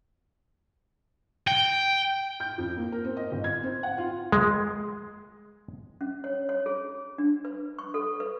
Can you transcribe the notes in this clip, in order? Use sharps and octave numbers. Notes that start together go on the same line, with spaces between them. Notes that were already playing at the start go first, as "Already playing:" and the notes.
G5
G6
F2
A#3
A#4
C4
D#5
G1
G#6
C4
F#5
F4
G#3
C#4
C#5
C#5
G#4
D4
B4
C#6
A4
B4